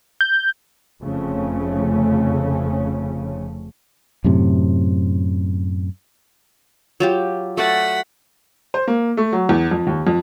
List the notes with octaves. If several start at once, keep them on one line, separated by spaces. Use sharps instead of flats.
G6
F1 F2 C#3 A3 C#4
F#2 A2 C3
F#3 F4 G4
A3 F#4 D5 F#5 B6
C5
A#3
A3
F#3
E2
F2
D#2
F2